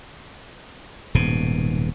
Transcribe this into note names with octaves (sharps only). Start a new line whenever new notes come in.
D#1 G#2 B2